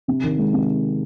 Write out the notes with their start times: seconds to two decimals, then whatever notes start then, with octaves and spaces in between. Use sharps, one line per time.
0.08 C3
0.23 D#3
0.38 G#3
0.53 C3